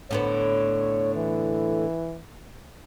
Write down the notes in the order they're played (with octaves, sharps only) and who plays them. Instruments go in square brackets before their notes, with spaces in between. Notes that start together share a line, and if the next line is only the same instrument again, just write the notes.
[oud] A2 D3 B3 [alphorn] C#5
[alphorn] E3